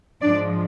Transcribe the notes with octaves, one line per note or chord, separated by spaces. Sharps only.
G#2 F3 G#3 D4 D5